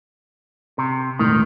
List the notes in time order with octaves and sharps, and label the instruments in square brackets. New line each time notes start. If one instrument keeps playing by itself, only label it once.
[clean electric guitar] C3
[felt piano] E1 A2 [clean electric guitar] D#3